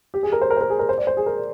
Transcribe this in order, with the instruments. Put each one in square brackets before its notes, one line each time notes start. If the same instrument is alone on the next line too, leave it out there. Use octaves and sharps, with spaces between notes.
[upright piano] G4
G#4
A#4
C5
A#4
C5
A#4
G#4
A#4
C5
D5
C5
G#4
A#4